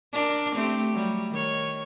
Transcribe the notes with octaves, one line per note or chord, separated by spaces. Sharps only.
D4 A#4
A3 C4 G4
F#3 G3
D#3 C#5